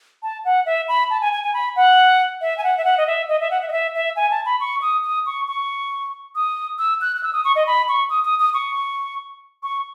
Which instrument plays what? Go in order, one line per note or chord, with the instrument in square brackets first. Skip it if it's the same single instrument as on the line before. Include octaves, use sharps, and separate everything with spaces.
[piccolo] A5
F#5
E5
B5
A5
G#5
G#5
G#5
B5
F#5
E5
G#5
F#5
E5
F#5
D#5
E5
D#5
E5
F#5
E5
D#5
E5
E5
G#5
A5
B5
C#6
D#6
D#6
C#6
C#6
D#6
E6
F#6
F#6
E6
D#6
C#6
D#5
B5
C#6
D#6
D#6
D#6
C#6
C#6